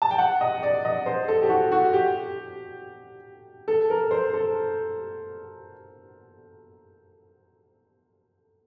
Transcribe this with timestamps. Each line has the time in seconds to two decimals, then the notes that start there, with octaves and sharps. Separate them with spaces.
0.02 A5
0.11 G5
0.18 F#5
0.41 D#5
0.63 D5
0.85 D#5
1.06 C5
1.28 A4
1.42 G4
1.49 F#4
1.72 F#4
1.93 G4
3.68 A4
3.90 A#4
4.11 C5
4.34 A4